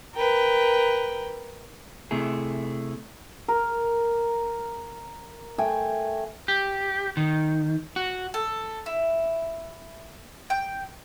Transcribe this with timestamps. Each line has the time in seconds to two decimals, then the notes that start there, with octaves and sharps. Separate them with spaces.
0.15 A#4 B4 G5
2.11 C3 A3 E4 G#4
3.48 A#4
5.58 A3 G5 G#5
6.48 G4
7.17 D#3
7.96 F#4
8.34 A4
8.86 E4
10.50 G5